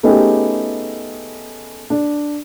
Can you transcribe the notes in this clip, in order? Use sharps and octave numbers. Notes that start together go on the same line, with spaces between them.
A3 B3 C#4 D#4 G4 G#4
D4